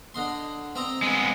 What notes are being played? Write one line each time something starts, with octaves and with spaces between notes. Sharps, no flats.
D3 D#5 C6
C4 D#5 A#5
G#3 B3